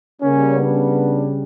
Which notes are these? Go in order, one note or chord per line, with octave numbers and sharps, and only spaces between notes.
C#3 G3 A#3 C#4
B3 D4